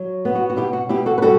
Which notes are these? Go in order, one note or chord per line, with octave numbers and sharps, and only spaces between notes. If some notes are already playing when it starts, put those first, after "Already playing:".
Already playing: F#3
B3
F#4
F#4
B2 E4 G4
F#4
B2 E4 G4
F#4 A4
B4
G3 F#4 A4